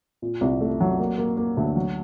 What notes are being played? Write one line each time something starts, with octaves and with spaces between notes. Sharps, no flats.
A#2
C2
A3
F#3
A#3
A#3
A#3
D2
F#3